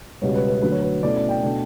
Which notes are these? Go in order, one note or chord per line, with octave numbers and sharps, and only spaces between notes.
C#2 B2 G3 B3 C#5
B4
B4
D2 D3 F#3 B4
C#5
B4
B2 A3 C#4 E4 D5
D5
G5
B2 A3 D4